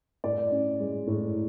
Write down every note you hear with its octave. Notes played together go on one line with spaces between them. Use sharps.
A2 D5
C#4
G#3
A2